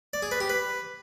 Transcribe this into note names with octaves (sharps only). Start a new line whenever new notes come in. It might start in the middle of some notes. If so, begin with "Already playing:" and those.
D5
G#4
B4
G4
B4